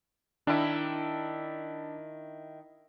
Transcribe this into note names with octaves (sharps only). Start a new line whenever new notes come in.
D#3 D4 E4